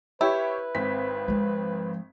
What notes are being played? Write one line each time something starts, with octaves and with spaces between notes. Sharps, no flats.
E4 G4 B4 C#5 E5
G#1 C4 B6
F3 G#3